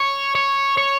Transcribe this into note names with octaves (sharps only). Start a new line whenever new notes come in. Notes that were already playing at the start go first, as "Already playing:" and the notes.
Already playing: C#5
C#5
C#5